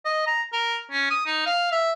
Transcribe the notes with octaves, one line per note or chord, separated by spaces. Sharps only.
D#5
A#5
A#4
C#4
D#6
D#4
F5
E5